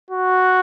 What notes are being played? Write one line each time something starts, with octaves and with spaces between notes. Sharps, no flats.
F#4